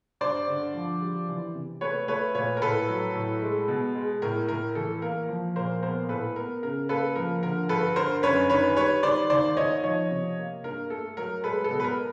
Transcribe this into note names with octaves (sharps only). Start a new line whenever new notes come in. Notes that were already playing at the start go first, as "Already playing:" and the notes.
G2 C5 D5
D3
F3
G3
E3
C3
A3 B4 C#5
A3 B4 C#5
A#2 B4 C#5
A#4
A2 A4 B4
F#3
A2
G#3
B2
G#3
A2 A#4
A2 A#4
E3 A4
A#3 A#4
F3
A#2 A#4 C5
B3 A#4 C5
A2 A4 B4
B3 A#4
C#3 A#4
A#3 A4 B4
F3 A#4
D3 A#4
G2 A4 B4
D3 A#4 C5
F#2 B4 C#5
D#3 B4 C#5
G3 B4 C#5
D#3 C5 D5
D#2 C5 D5
D#3 C#5 D#5
F3 C#5 D#5
C3
A#3
G2 A#4
A3 A4
F#3 A#4
G#3 A4 B4
A4
B2
B4
A#4